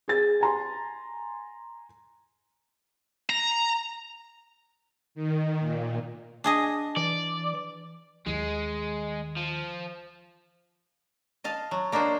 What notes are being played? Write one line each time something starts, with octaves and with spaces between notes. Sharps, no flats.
G#4 A6
G#5 A#5 C6
A#5
D#3
A#2
D4 G#4 D#5
E3 D5
D#2 D#3 G#3
F3
D#5 F5 A5
F#3
A#3 D4 D#4 F#4 C5